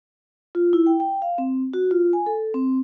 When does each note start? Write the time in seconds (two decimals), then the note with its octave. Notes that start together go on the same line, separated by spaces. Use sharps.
0.55 F4
0.73 E4
0.86 G5
1.00 G5
1.22 F5
1.38 C4
1.73 F#4
1.91 F4
2.13 G#5
2.26 A4
2.54 C4